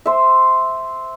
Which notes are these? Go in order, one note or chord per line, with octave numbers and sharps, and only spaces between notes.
C5 E5